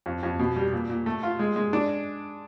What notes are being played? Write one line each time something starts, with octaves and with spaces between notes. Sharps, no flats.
F2
F2
B2
G3
A#2
A#2
A3
F4
G#3
G#3
D4